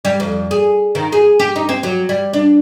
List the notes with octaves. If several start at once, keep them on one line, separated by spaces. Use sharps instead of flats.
G3
F2
G#4
D#3
G#4
G4
D#4
C4
F#3
G3
D4